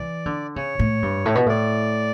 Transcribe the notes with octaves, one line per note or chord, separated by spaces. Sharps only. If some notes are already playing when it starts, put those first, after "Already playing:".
Already playing: E3 D5
D3
C#3 C#5
A2
G2
A2
B2
A2 D5